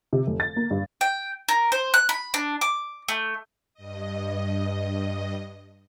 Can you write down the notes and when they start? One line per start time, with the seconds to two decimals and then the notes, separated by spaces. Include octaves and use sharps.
0.13 C3
0.27 F1
0.40 A6
0.56 A#3
0.71 G2
1.01 G5
1.48 A#4
1.72 C5
1.94 F#6
2.09 B5
2.34 D4
2.61 D6
3.09 A3
3.74 G2 D#5